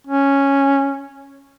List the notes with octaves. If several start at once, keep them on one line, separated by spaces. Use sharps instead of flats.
C#4